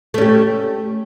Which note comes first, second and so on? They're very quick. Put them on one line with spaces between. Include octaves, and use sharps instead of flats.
A3 C#4 G4